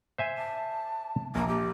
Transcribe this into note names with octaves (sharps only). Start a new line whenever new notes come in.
C5 E5 G#5
A5
A#1 A#3
G4